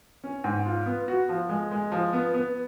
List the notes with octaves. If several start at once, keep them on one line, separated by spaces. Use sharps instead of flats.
C#4
G#2
F4
B3
F#4
F3
G#3
G#3
F3
B3
B3